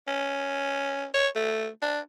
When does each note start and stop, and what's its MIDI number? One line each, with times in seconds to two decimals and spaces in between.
0.08 1.05 61
1.14 1.28 73
1.35 1.68 57
1.82 2.00 62